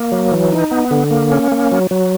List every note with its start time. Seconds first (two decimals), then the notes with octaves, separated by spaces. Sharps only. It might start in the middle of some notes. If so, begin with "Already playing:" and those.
Already playing: A#3
0.12 F#3
0.32 E3
0.52 D#4
0.71 B3
0.91 D3
1.11 A#3
1.31 C#4
1.52 A#3
1.72 F#3
1.91 F#3